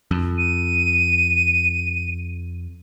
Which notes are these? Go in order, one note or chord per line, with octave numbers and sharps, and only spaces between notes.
F2
D#7